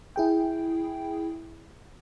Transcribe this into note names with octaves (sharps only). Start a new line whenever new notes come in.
E4 G#4 G5